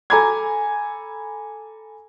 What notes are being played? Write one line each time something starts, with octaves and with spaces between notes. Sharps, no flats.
A4 G#5 A#5 B5 D6 G#6